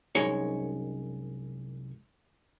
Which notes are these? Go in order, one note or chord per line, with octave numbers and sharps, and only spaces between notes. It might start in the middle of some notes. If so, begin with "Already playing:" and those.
C2 F#2 G#3 D#4 C#5